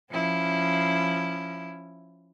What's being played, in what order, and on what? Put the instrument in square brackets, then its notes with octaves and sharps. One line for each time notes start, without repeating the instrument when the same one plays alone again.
[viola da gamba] F3 C#4 E4